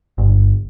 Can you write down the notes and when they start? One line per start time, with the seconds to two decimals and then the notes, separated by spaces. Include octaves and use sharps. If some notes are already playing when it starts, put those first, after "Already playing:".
0.18 G1